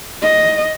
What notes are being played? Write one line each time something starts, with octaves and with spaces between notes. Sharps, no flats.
D#5